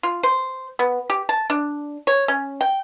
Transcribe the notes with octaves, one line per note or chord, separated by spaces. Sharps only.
F4
C5
B3
G4
A5
D4
C#5
C#4
G5